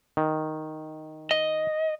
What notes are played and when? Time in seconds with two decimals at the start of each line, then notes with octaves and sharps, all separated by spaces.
0.17 D#3
1.31 D#5